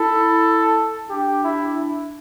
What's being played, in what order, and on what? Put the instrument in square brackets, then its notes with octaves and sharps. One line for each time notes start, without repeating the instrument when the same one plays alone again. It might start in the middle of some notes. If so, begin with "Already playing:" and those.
Already playing: [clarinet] E4 [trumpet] A4
[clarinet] D4 [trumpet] G4
[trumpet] E4